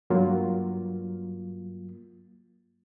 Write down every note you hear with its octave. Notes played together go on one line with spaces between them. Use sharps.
G2 F#3 A#3 F4